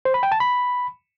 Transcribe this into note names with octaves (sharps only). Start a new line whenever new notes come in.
C5
B5
G5
A5
B5